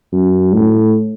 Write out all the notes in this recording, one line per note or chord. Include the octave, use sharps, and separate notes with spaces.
F#2
A2